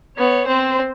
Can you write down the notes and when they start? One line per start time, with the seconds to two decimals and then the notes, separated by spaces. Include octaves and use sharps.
0.17 B3 C#5
0.47 C4 C5